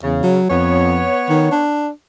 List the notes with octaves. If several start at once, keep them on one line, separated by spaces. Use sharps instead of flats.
E2 C#3
F#3
F2 B3 C#5
D#3
D4